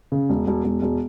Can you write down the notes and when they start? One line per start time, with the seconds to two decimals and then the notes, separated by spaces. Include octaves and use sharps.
0.12 C#3
0.29 E1
0.47 E1
0.64 E1
0.82 E1